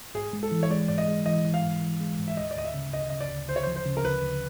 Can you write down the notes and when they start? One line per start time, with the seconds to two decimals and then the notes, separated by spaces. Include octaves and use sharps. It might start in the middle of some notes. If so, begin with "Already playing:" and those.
0.15 G#2 G#4
0.33 G#3
0.43 A4
0.52 E3
0.63 C#5
0.71 G#3 D5
0.88 G#2 D5
0.98 D#5
1.08 G#3
1.26 E3 D#5
1.45 E3
1.54 F5
1.63 G#2
1.82 E3
2.00 G#3
2.19 G#2
2.28 E5
2.37 D2 D#5
2.51 D5
2.56 D2 D#5
2.65 E5
2.74 C#3
2.93 D2 D#5
3.10 C#3 D#5
3.21 D5
3.30 D2
3.49 D2 C5
3.56 C#5
3.63 F3 C5
3.76 C5
3.86 C#3
3.97 A#4
4.05 D2 B4
4.23 D2